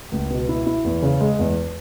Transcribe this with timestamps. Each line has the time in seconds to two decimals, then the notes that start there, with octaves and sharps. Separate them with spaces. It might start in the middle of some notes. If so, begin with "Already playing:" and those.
0.12 C#2
0.31 B2
0.49 E4
0.67 E4
0.84 E2
1.02 C#3
1.20 G#3
1.39 E2